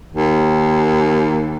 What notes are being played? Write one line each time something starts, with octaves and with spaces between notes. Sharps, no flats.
D#2